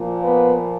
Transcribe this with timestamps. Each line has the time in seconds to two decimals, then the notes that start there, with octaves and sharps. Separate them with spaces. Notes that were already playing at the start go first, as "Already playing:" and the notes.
Already playing: A#2 F3 A#3
0.23 B3 B4